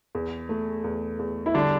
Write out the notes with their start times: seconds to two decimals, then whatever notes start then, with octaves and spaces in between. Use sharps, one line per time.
0.15 E2
0.49 A3
0.84 E2
1.19 E2
1.46 E4
1.54 D3 G3 D4